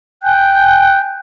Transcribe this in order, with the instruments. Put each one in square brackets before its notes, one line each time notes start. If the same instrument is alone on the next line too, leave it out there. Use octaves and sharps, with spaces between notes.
[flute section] G5 G#5 F#6 G6